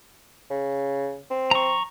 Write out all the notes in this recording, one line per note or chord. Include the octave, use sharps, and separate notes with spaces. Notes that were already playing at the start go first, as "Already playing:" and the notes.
C#3
C4
A#5 C#6